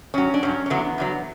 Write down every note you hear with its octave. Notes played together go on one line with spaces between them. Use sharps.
G2 F#3 C#4
D4
G2 F#3 C#4
C#4
E2 D3 F#3 B3
E2 D3 F#3